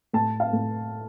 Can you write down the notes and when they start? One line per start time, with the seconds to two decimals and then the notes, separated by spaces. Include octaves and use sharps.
0.13 A2 A5
0.40 F5
0.53 A2